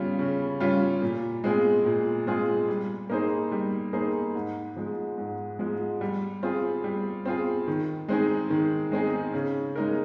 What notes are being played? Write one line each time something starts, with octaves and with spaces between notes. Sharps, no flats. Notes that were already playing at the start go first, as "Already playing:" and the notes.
Already playing: C#3 G3 C#4 F4
C#3
G3 C#4 F4
A#2
G#3 C4 F4 G#4
A#2
G#3 C4 F4 G#4
G3
A#3 D#4 G#4 C5
G3
A#3 D#4 G#4 C5
G#2
F3 G#3
G#2
F3 G#3
G3
C4 F4 G#4
G3
C4 F4 G#4
D#3
G#3 C4 D#4 G#4
D#3
G#3 C4 D#4 G#4
C#3
G#3 D#4 A#4